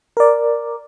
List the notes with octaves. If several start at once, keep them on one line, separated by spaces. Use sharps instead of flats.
A#4 D5